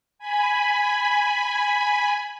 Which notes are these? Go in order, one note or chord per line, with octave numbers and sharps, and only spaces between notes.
G#5 B5